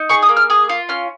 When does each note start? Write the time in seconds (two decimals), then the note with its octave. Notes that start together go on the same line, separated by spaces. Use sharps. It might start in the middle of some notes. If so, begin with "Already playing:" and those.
Already playing: D#4
0.09 G#4 C#6
0.23 D#6
0.29 A#3
0.37 F6
0.50 G#4 D#6
0.69 F4
0.89 C#4 F6